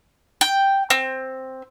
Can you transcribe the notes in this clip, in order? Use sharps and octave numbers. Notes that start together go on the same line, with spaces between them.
G5
C4